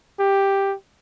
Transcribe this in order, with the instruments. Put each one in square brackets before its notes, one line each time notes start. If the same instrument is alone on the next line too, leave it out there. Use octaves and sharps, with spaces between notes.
[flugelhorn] G4